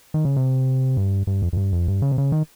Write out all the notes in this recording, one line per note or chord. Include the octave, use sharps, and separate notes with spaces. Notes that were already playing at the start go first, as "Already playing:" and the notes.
D#3
C#3
C3
G2
G2
F2
F2
G2
F2
G2
C#3
C3
C#3
D#3